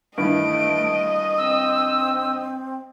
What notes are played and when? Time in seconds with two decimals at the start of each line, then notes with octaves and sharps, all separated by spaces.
0.18 G2 D#3 E3 A3 D#5 D7
1.38 C4 E6